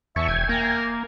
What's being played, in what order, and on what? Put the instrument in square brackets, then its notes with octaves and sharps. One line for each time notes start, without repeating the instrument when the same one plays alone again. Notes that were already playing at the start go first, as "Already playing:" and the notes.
[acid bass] E2 [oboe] E5 [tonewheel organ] G#5 A5 C#6
[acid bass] E1 [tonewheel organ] G5 G#5 G#6
[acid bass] A#3 [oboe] A#4